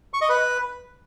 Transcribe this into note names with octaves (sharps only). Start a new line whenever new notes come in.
C#6
D#5
B4